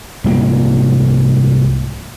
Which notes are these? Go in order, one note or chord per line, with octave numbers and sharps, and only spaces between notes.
C2 G#2 F3 A#3